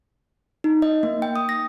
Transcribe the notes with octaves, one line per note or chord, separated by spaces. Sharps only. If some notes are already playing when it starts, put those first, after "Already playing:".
D#4
D#5
A#3
G5
D#6
A#6